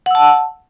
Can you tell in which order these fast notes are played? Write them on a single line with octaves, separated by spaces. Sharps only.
F#5 E6 A5